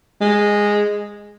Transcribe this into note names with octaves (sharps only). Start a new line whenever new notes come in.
G#3